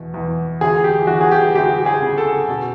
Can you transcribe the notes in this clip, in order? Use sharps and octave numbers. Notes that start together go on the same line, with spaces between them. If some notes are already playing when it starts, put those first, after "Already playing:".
Already playing: E2 B2
E2
D2 G#4
G4
E3 F#4
G#4
G4
D2 G4
G#4
C#3
A4
B2